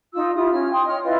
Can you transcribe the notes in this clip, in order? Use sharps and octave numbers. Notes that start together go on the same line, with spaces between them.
D#4 F4 E6
E4 F4 G4 D#6
C#4 F6
G5 C6 D#6
C#5 D#5 F6
E4 F4 B4 D#5